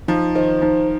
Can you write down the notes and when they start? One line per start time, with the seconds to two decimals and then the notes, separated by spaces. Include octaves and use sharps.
0.08 F3 D#4
0.35 D#3 C5
0.62 F3 D#4